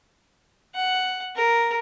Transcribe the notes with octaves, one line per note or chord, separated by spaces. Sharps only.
F#5
A#4